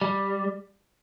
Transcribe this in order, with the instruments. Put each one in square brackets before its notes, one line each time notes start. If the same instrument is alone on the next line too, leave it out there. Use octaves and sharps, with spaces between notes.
[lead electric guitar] G3